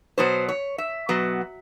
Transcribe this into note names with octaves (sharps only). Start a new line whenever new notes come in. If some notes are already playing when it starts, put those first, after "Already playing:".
B2 F#3 B3 C5
C#5
E5
B2 F#3 B3